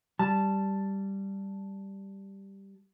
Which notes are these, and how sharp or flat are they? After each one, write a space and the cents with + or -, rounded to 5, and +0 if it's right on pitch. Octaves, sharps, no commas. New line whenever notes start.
G3 +0 A5 +0